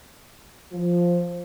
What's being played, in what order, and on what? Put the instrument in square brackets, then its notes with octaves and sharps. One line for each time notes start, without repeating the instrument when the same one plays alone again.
[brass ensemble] F3